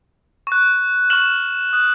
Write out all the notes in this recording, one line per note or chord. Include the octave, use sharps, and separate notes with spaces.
C#6 F#6
C#6 F6 E7 F#7
D#6 F#6